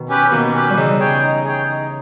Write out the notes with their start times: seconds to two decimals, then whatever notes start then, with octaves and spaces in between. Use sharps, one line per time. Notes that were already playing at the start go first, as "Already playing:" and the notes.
Already playing: B2 D#3
0.09 C#4 G4 B4
0.31 B2 D#3 A#3
0.54 C#4 G4 B4
0.69 G3
0.77 C#3 E3 D#4
0.99 G#4 C#5 G5
1.22 D#4
1.44 G#4 C#5 G5
1.67 D#4